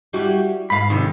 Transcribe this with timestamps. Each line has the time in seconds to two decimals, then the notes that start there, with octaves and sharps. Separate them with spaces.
0.13 G3 E4 F#4
0.70 G#2 F5 B5
0.90 C3 D#3